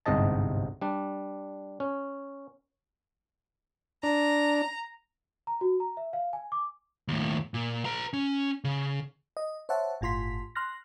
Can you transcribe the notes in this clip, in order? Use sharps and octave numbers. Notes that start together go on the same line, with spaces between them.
G1 C2 G#2 C3 D#5 A5
G3 D4
C#4
D4 A#5
A#5
F#4
A#5
E5
F5
G#5
D6
D#2 A2
A#2
B4 A#5
C#4
C#3
D#5
C5 C#5 E5 F#5 A5
G1 A2 F4 C6 B6
C6 F6 F#6 A#6